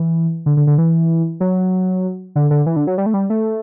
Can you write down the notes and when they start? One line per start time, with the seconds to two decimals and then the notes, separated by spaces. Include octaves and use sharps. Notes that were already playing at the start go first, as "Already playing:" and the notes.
Already playing: E3
0.46 D3
0.57 D3
0.67 D3
0.78 E3
1.40 F#3
2.36 D3
2.51 D3
2.66 E3
2.76 D3
2.87 F#3
2.98 G3
3.06 A3
3.14 G3
3.30 A3